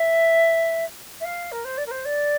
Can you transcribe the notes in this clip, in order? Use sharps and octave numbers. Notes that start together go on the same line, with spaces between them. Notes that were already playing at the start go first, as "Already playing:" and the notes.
Already playing: E5
E5
F5
A#4
C5
D5
A#4
C5
D5